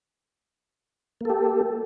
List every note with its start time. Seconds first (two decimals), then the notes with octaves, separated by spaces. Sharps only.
1.21 A#3
1.25 A4
1.30 G4